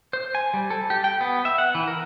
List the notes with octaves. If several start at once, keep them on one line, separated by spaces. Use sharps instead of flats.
C5
G#5
G3
A4
G4
G5
B3
E5
F#5
E3
A#4